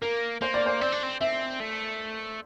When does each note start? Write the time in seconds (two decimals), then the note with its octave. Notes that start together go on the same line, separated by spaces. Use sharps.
0.02 A#3 A#4
0.41 A#3 C5
0.54 D5
0.66 C5
0.80 C4 D5
0.92 D4
1.03 C4
1.21 C4 E5
1.60 A3